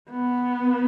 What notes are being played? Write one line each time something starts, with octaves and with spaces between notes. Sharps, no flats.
B3